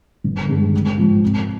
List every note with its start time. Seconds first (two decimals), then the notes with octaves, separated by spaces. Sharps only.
0.24 G1
0.49 G2 D#3 G#3
0.73 G#1
0.98 G#2 F3 G#3
1.22 C3